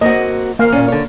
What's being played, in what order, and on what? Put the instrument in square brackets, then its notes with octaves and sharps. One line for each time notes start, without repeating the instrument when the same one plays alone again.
[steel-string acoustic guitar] A#3 C4 F#4 [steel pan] D#5
[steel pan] A#3 F5
[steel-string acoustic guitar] A#2 C#4
D3 C#5